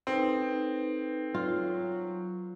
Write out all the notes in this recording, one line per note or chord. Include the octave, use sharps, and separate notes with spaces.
C4 D#4 A4 B4
F#3 F4